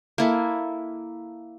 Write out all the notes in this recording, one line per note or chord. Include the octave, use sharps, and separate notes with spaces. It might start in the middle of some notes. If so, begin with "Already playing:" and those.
A#3 E4 A4